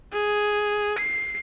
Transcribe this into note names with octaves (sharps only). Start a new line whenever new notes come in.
G#4
C7